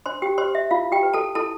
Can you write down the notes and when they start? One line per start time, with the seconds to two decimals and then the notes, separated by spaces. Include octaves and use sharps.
0.06 D4 C5 C6
0.22 G4 G5
0.38 G4 B4 C5 C6
0.55 E5
0.71 E4 F4 F5
0.92 G4 G5
1.03 B4
1.13 A4 A5
1.35 E4 A4 A5